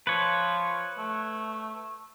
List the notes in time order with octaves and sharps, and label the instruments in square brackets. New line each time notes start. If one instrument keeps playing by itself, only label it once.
[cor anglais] F3 [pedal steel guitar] B4 C#5
[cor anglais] A3